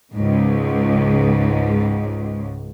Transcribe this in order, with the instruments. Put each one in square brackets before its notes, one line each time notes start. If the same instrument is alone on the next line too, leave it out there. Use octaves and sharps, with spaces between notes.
[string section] C#2 G#2